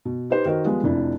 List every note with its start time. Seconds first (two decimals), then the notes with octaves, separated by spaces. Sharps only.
0.05 B2
0.30 D#4 G4 B4 C5
0.45 D#3 F#4 A#4 C5 D#5
0.65 F3 G3 G#3 B3
0.84 F1 F2 D4 E4